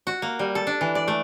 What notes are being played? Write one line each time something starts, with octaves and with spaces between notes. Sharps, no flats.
F#4
A#3
G3
A4
D4
E3
D5
A3